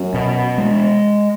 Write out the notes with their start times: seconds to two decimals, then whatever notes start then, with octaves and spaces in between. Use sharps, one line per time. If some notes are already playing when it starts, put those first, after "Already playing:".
Already playing: F#2
0.14 B2
0.58 G#3